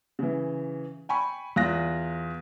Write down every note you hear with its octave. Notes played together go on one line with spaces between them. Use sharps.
C#3 E3
G5 G#5 B5 C#6
E2 F4 F#6 A#6